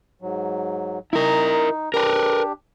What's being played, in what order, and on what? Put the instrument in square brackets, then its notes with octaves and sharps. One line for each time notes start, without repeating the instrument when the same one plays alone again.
[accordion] G#2 F#3
[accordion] D#4 [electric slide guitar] E4 A#4
[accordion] D4 G4 [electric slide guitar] A#4 B4